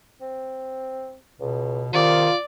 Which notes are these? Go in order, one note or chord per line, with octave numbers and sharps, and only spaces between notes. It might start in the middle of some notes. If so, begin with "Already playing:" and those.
C4
C#2 B2
C3 D#3 F4 D5